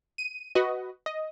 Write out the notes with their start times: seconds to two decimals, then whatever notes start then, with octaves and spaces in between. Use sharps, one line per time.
0.18 D#7
0.55 F#4 B4 D#5
1.06 D#5